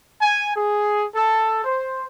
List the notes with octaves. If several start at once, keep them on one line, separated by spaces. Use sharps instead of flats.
G#5
G#4
A4
C5